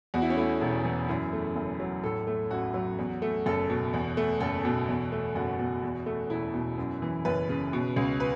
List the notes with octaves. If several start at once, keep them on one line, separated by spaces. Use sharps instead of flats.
E2 F#4
E4
C#4
A3 E4
E1
E3
F#2 E4
A3
F#1
F#3
A2 A4
A3
A1 F#4
F#3
E2
A3
F#1 A4
B2
E2
A3
F#1 A4
B2
E2
A3
F#1 F#4
B2
E2
A3
E1 E4
B2
F#2
E3
F#1 B4
C#3
B2
C#2
B4